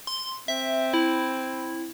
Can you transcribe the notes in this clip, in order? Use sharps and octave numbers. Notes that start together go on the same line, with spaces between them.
C6
C4 E5
E4